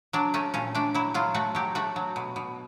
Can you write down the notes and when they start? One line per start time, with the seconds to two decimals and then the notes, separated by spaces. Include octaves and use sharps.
0.13 F#3 D4
0.34 A3 C#4
0.54 A#2 C#4
0.75 A3 D4
0.94 F#3 E4
1.14 F#3 F4
1.35 A3 F#4
1.55 F#3 G4
1.75 A3 F#4
1.96 F#3
2.16 B2
2.36 B2